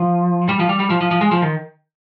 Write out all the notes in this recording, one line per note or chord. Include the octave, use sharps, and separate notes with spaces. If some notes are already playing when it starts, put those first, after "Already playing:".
Already playing: F3
G3
F3
G3
G3
F3
F3
F3
G#3
F3
D#3